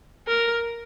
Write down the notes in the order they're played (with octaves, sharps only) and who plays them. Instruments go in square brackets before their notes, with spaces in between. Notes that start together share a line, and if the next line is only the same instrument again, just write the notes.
[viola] A#4